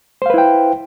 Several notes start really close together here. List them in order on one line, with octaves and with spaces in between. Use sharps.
C5 F5 B4 E4 G5